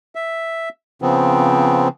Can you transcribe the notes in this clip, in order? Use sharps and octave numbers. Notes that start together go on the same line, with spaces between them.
E5
C#3 F3 B3 C4